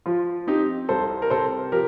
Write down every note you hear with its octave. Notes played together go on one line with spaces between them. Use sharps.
F3 F4
C4 D#4 G4
C2 A4 C5
A#4
C3 A4 C5
F3 G4 A#4